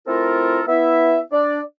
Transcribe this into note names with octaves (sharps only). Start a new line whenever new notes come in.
A3 C4 E4 F4 A4 A#4
B3 E4 E5
D4 D5